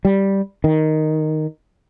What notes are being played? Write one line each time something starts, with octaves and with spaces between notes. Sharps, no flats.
G3
D#3